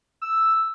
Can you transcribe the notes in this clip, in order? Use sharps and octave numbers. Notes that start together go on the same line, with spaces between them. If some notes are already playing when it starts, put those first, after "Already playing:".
E6